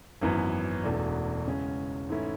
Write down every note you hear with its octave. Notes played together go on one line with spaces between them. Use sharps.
G#1 F#2 E3 B3
E1 E2 B2 A3 D4
E2 C#3 G#3 C#4
G#2 E3 A3 C#4 E4